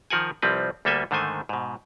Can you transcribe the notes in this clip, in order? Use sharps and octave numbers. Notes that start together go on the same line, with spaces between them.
D#3 F3 A#4 F#5 G#5
C2 F3 G3 C4 B4
D2 G3 A#3 A4 E5 G#5
G#2 D3 D#3 A3 C5 G#5
G#2 B2